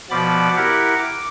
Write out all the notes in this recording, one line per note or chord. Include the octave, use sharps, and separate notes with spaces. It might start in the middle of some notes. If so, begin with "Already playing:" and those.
B2 F3 B3 D5 B5 D6
E4 G4 A#4 F#5
D6